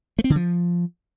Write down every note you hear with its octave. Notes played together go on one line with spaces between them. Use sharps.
A3
C4
D3
F3